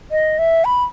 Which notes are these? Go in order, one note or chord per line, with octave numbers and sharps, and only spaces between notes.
D#5
E5
B5